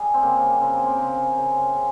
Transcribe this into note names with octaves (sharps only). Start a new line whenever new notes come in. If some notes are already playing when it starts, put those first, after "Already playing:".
Already playing: G3 G#4
C4
C#3 A#3
C#3 C4
A#3
C4
C#3
C#3
C#3